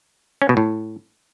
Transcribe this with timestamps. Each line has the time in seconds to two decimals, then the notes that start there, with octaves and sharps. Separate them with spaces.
0.42 C#4
0.49 B2
0.57 A2